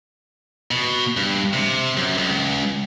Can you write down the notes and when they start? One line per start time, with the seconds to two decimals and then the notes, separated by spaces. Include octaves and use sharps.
0.71 B2
1.17 G2
1.54 C3
1.97 F#2
2.18 C#2